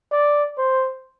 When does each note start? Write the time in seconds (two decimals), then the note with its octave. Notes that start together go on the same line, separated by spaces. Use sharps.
0.12 D5
0.57 C5